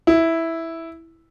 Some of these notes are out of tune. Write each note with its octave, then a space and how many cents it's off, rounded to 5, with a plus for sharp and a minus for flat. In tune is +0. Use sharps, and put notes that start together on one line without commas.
E4 -5